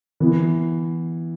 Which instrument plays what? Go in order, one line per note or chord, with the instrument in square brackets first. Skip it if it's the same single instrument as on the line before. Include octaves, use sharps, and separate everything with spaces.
[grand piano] E3 B3 E4